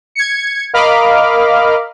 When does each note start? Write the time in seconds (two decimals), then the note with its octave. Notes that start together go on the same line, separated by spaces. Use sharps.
0.15 G#6 C#7
0.74 A#4 D#5 F5 B5 D6 F6